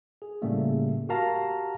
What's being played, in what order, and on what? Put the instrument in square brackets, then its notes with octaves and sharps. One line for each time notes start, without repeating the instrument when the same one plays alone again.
[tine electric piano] G#4
A2 C#3 G3 A3 A#3
F#4 G4 A#4 F5 A5 A#5